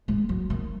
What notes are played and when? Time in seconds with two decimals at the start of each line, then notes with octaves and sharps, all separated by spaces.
0.08 G#3
0.29 F#3
0.50 D#3